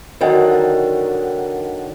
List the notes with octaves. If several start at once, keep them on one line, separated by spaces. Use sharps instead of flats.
D3 D#3 F#3 A#4